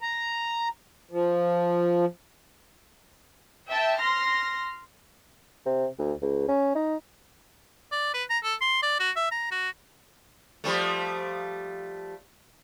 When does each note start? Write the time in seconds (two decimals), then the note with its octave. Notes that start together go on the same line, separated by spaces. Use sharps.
0.01 A#5
1.11 F3
3.71 E5 G5 A5
3.99 C6 F6 A#6
5.66 C3
5.99 D2
6.22 C#2
6.48 C#4
6.75 D#4
7.92 D5
8.14 B4
8.30 A#5
8.44 A4
8.61 C6
8.82 D5
9.00 F#4
9.16 E5
9.32 A#5
9.51 F#4
10.64 F3 G3 A3